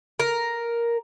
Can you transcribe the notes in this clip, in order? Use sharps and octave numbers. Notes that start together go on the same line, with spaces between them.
A#4